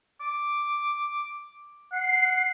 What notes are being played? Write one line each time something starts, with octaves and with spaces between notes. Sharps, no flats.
D6
F#5 C7